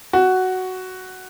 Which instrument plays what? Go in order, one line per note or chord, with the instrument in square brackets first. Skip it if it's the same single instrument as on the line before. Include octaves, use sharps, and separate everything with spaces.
[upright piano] F#4